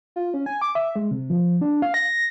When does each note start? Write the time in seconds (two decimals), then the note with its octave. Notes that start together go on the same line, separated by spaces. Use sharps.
0.16 F4
0.34 C#4
0.46 G#5
0.62 D6
0.75 E5
0.96 G#3
1.11 C3
1.30 F3
1.61 D4
1.82 F5
1.94 A#6